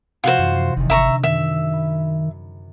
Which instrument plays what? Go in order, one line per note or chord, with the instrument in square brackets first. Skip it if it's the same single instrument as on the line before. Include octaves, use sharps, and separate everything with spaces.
[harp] C3 F3 [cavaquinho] F4 F#4 C5
[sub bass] F#2 [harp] E3
[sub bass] F#1 [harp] E2 C3 D#3
[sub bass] G1 [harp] D3 [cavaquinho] E5 A#5 C#6
[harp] F#2 [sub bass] D#3 [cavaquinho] E5
[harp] B5